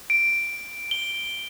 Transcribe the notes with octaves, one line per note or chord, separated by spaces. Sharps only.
D7
G7